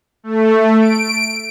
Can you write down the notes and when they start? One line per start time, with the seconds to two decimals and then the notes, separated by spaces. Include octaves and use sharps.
0.24 A3
0.80 D7